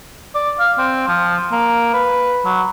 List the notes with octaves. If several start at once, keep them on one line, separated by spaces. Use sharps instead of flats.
D5
F5
C4
F3
A#3
B4
F#3